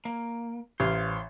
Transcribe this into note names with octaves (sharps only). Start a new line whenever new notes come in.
A#3
A1 C5 F5